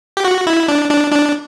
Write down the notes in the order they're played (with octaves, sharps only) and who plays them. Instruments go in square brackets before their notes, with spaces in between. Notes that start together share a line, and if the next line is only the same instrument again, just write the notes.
[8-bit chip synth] G4
F#4
E4
D4
D4
D4